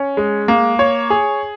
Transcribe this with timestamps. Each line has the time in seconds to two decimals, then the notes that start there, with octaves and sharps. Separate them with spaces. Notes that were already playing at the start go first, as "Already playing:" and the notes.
Already playing: C#4
0.17 G#3
0.48 A#3
0.79 C#5
1.10 G#4